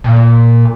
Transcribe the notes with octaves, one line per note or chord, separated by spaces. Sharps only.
A#2